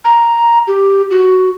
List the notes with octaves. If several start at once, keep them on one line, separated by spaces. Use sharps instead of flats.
A#5
G4
F#4